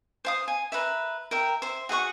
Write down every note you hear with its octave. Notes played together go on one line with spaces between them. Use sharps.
C5 F5 D#6
G#5
A#4 B4 C#5 E5
A#4 E5 G5
C5 E5
F#4 G#4 F#5 C#6